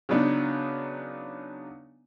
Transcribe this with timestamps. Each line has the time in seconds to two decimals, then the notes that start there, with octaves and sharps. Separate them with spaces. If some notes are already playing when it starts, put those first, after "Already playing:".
0.09 C#3 F#3 B3 D4 D#4